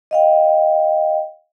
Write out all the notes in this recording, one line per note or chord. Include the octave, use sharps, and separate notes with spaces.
D#5 F5 G5